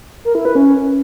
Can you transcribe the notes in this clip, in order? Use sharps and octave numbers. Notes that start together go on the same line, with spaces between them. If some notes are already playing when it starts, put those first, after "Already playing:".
A#4
E4
B4
C#4